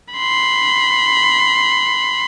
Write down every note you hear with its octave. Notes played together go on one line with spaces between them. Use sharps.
B5 C6